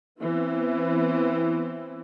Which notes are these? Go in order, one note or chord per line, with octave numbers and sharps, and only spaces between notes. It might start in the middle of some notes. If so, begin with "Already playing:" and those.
E3 B3 C4 E4